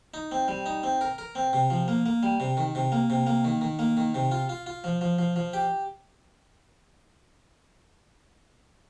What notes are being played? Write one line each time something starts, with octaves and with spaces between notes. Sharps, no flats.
D#4
C4
G3
D#4
C4
A#4
A#4
C4
C3
F3
A#3
A#3
G3
C3
D#3
C3
A#3
C3
A#3
D#3
D#3
A#3
D#3
C3
F4
F4
F4
F3
F3
F3
F3
G4